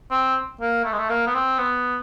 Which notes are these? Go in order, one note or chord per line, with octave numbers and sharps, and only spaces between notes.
C4
A#3
A3
G#3
A3
A#3
B3
C4
B3